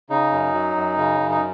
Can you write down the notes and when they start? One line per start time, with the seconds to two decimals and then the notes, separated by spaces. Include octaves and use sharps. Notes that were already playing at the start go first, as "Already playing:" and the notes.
0.10 C#3 D#4
0.31 F#2
0.54 F#3
0.76 F#2
0.98 C#3
1.20 F#2
1.30 D#4